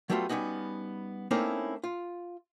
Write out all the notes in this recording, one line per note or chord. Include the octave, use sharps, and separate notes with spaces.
F#3 G3 A3 B3 D4 F4
G3 B3 C#4 D#4 F#4
A3 A#3 C4 C#4 D#4 E4
F4